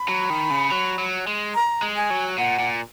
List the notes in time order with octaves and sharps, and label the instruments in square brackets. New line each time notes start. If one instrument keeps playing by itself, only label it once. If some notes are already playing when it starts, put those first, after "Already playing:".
Already playing: [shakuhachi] B5
[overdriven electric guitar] F#3
D#3
C#3
F#3
F#3
G#3
[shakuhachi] A#5
[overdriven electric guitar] G#3
[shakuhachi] G#5
[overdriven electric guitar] F#3
[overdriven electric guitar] A#2 [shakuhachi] F#5
[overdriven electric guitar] A#2